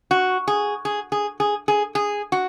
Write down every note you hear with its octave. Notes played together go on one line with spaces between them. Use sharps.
F#4
G#4
G#4
G#4
G#4
G#4
G#4
F#4